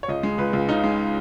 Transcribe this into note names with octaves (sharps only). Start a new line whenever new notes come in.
C#5
C#2 D#5
G#3
C#2 B4
C#2
C#3 D#4
G#3